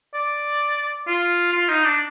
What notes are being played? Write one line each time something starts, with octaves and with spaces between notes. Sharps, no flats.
D5
F4
F4
D#4
D4